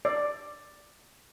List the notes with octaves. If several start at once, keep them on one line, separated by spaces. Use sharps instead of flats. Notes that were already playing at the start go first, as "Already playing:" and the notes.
D5